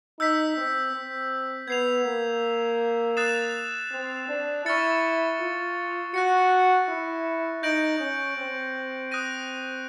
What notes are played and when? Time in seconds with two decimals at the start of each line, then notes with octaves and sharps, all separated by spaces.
0.19 D#4 E6 G6 B6
0.57 C4
0.93 C4
1.68 B3 G#6 C7 F7
2.05 A#3
3.17 D#6 F#6 A6 C7 E7
3.92 C4
4.29 D4
4.65 E4 C#6 F6 A6 C#7
5.40 F4
6.14 F#4 F#6 A#6 C#7
6.89 E4
7.63 D#4 G6 A#6 D7 F#7
8.00 C#4
8.37 C4
9.11 D#6 F#6 A#6 D#7